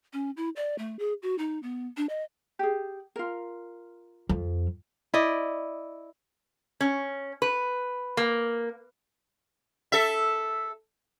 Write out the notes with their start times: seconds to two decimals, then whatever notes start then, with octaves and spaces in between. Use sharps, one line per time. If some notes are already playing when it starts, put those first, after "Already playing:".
0.13 C#4
0.37 E4
0.56 D5
0.78 A3
0.99 G#4
1.22 F#4
1.38 D#4
1.63 B3
1.97 D4
2.09 D#5
2.59 G4 G#4
3.16 F4 A#4
4.29 F2
5.14 E4 D5 D#5
6.81 C#4
7.42 B4
8.17 A#3
9.92 A4 E5